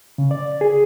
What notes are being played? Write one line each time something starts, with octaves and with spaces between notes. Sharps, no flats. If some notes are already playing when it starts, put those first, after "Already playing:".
C#3
D5
G#4